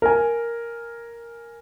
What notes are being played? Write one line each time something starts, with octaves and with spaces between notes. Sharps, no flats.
A#4 G#5